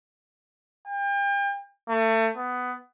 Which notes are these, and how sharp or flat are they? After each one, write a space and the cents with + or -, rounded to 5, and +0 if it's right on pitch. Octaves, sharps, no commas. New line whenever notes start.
G5 +40
A3 +30
B3 +15